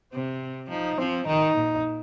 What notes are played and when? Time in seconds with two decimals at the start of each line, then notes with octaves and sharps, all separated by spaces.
0.12 C3 C4
0.69 F3 D#4
0.97 F3 C4
1.26 D#3 D#4
1.55 A#2